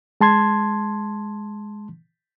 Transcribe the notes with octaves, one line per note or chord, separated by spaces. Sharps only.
G#3 A5 C6 G#6